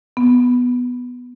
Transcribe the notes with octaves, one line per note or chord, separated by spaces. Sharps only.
B3